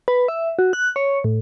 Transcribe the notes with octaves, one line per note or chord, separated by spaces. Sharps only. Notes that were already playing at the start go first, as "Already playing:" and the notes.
B4
E5
F#4
F#6
C#5
A2